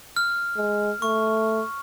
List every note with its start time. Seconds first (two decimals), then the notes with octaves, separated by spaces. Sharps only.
0.16 F6
0.57 G#3
1.02 A3 C#6